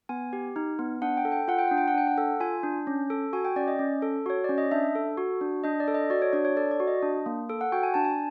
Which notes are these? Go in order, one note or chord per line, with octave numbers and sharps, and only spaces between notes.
B3 G#5
G4
D#4
B3
D4 F#5
G5
A4
G5
F4 F#5
G5
D4 F#5
G5
F#5
D4 G5
F#5
A4
F4 G#5
D4
C#4
A4
F#4 G#5
G5
C#4 D5
D#5
C#4
A4
F#4 C#5
C#4 D5
D#5
D4 E5
A4
F#4
D4
D4 D#5
D5
A4
D#5
F#4 D5
C#5
D4 D5
C#5
A4 D5
D5
F#4
D#5
D4
A#3
A4
F#5
F#4 G5
G#5
D4 A5
G#5